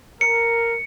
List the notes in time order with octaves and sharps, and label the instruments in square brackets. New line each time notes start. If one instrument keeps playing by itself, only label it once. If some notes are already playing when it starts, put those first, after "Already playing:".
[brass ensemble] A#4 [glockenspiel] C#7